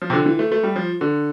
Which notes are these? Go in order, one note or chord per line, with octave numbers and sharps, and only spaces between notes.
F3
C3
D3
E3
A3
A3
G3
F3
D3